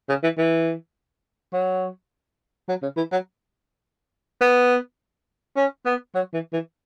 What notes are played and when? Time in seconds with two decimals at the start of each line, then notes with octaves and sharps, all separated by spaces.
0.09 C#3
0.23 E3
0.38 E3
1.53 F#3
2.68 F#3
2.82 C#3
2.97 E3
3.12 F#3
4.41 B3
5.56 C#4
5.85 B3
6.15 F#3
6.33 E3
6.53 E3